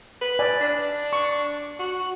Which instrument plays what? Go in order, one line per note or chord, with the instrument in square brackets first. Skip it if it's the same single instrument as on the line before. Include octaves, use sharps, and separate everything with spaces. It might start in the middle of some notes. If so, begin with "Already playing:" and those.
[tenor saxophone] B4
[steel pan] D5 G#5
[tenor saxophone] D4
[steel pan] C#6
[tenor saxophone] F#4